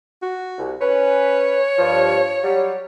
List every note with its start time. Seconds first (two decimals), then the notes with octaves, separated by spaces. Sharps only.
0.22 F#4
0.58 C2
0.81 C#4 B4 C#5
1.78 G2 F3
2.43 F#3 G3